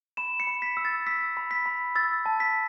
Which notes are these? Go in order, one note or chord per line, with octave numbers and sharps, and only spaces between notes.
B5 E7
C#7
B5
B6
E6
A6
E6 B6
B5
B6
B5
E6 A6
A5
B6